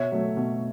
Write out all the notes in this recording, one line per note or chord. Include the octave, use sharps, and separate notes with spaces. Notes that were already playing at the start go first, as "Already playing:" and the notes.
Already playing: B2 C#5 E5
F#3 A3
B2